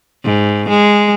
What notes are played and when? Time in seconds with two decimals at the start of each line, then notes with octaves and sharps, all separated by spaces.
0.24 G#2
0.69 G#3